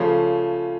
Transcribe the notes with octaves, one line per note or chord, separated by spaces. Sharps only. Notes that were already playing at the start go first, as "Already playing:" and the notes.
Already playing: C#3 F3 A3 C#4